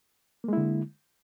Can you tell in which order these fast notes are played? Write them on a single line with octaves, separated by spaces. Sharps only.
A#3 G#3 E4 D3